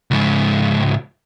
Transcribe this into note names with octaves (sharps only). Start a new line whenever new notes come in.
C#2 G#2